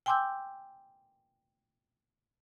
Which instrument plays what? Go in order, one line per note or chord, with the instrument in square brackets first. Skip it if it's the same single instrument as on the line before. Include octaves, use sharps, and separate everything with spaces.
[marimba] G5 G#5 C6 D6 E6 G6